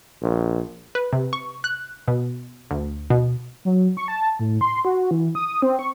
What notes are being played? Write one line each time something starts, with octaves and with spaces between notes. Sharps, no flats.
A#1
B4
C3
C#6
F#6
B2
D2
B2
F#3
C#6
A5
A2
C6
F#4
E3
D#6
C4
C#6